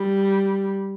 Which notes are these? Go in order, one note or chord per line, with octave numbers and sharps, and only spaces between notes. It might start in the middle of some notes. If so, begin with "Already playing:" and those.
Already playing: G3